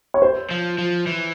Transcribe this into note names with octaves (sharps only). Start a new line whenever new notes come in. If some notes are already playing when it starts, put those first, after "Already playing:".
C#5
C5
F3
F3
E3